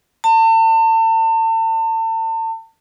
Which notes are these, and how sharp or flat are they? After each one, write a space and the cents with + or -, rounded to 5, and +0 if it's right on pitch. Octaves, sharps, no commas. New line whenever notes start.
A5 +40